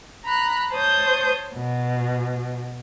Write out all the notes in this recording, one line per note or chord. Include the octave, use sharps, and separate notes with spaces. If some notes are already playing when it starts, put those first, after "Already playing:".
A#5 B5 F#6
C5 C#5 A5 D#6 G6
B2